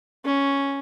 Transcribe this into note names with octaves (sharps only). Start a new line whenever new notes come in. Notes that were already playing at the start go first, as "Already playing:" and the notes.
C#4